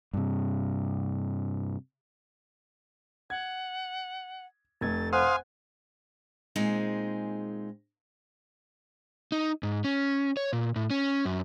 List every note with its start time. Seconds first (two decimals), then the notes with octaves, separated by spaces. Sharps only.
0.14 G2 C3
3.30 F#5 G#6
4.81 F1 A3 G#6 A6
5.13 C5 F5 F#5 G#5 C6 D#6 F#6
6.56 A#2 G#3 C4 D#4 G#4
9.32 D#4
9.63 G#2
9.84 C#4
10.37 C#5
10.53 A#2
10.76 A2
10.90 C#4
11.26 F#2